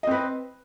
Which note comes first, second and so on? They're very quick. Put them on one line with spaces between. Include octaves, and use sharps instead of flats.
D#5 C4 B4